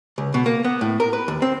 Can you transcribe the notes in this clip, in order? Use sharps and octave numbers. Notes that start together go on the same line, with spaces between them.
C#2
B2
A#3
B3
A2
A#4
B4
D#2
C4